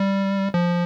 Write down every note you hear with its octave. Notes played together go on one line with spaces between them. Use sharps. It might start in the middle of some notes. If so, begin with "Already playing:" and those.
Already playing: G3
F3